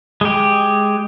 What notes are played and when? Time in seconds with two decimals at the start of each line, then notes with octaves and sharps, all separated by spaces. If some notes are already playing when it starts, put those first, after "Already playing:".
0.21 G#3 G4